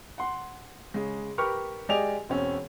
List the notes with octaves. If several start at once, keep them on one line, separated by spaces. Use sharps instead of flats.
F#5 C6
C#3 G#3
G4 A#4 B4 C#6 F6
G#3 G4 D5 D#5 G#5 F7
E1 C4 C#4